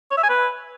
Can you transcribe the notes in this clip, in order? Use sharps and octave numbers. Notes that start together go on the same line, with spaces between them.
C#5
E5
G#5
B4